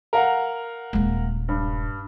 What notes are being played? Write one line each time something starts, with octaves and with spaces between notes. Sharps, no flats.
A#4 F5 F#5
D#1 G#3
G2